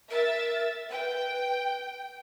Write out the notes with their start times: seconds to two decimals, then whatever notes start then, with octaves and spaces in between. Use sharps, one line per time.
0.10 A#4 E5 A6
0.91 B4 G5